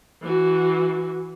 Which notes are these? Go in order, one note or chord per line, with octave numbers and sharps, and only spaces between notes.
E3 F#4